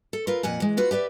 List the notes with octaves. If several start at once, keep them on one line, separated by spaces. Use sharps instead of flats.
A4
F4 A#4 B4
F2 A#2 F#5 G#5
E3 G#3
F4 F#4 B4
G4 B4 D5 E5